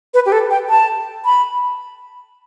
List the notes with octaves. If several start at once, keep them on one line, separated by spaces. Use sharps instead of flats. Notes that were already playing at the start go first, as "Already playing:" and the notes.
B4
G4
A4
G5
A5
B5